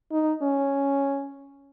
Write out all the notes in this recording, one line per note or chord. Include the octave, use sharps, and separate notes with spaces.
D#4
C#4